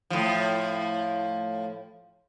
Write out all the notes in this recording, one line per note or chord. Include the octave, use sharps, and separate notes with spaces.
A2 F3